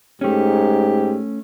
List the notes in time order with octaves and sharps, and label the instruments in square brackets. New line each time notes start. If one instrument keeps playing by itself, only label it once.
[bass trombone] G#2 [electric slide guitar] A3 C#4 [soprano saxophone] G4